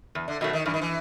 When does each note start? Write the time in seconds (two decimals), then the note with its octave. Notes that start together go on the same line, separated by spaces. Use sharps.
0.15 E2
0.28 D3
0.41 B2 D#3 F#3 A3
0.53 D#3
0.66 G2 E3
0.74 D#3
0.82 E3